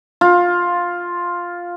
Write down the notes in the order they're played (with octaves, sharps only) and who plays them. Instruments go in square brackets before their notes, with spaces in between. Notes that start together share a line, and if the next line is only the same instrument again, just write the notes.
[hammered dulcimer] F4